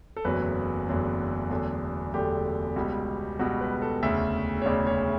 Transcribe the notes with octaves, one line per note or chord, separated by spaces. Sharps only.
A4
F#1 E2 D3 F#3 A3 B4
F#1 E2 D3 F#3 A3
E1 E2 D3 F#3 A3 A4
E1 E2 D3 F#3 A3 G4
C#2 B2 G3
C#2 B2 G3 F#4
B4
A4
E1 D2 C#3 E5
C#5
E1 D2 C#3 D5
C#5